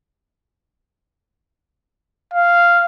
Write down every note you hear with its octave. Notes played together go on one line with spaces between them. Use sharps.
F5